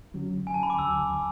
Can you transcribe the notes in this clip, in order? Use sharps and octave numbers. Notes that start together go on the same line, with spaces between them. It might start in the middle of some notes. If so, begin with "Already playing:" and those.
D3 F#3 C#4 F#4
G#5
A5
B5
D6
D2 D3 F#3 E6